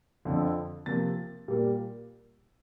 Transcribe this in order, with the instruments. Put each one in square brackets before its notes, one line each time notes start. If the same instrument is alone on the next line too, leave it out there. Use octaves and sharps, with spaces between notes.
[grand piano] F2 D3 F3 C4
C3 F3 A#3 A6
A#2 G3 A#3